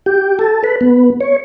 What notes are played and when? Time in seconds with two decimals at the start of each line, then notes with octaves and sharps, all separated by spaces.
0.06 G4
0.39 A4
0.64 B4
0.81 B3
1.20 C#5